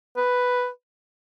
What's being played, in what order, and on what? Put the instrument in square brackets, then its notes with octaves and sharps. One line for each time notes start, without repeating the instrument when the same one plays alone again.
[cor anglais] B4